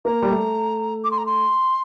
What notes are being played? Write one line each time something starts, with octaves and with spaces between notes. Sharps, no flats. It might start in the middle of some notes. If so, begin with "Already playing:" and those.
A#3 A#5
G3
A3
D6
C6
A#5
C6